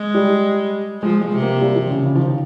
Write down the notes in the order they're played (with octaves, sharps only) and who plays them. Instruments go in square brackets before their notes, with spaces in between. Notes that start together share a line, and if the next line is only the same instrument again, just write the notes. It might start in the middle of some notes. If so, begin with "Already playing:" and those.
Already playing: [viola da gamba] G#3
[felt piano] G3
[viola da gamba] F3 [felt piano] G#3
[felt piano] G#3
[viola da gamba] C3
[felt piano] A#3
G3
F3
C#3
C#3
F3
D#3